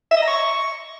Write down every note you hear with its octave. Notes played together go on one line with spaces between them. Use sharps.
E5
D#5
A#5
C#6